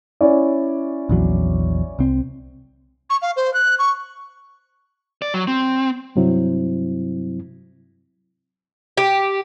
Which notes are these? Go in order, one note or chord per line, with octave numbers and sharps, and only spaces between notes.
C#4 E4 D5
A#1 E2 F#3
C2 C4
C#6
F5
C5
F#6
C#6
D5
F#3
C4
G2 C3 F#3 C4 E4
G4